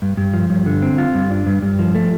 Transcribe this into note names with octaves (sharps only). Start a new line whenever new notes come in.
G2
G2
F3
G2
D3
C4
F4
G2
D4
G2
G2
F3
A3